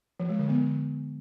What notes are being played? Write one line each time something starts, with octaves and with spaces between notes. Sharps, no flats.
F3
G#3
D3
B3